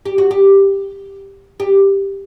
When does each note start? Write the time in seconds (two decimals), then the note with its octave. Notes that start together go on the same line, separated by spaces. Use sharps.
0.05 G4
0.18 F#4
0.31 G4
1.60 G4